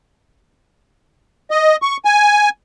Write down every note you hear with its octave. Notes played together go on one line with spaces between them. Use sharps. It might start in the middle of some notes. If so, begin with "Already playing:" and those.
D#5
C#6
G#5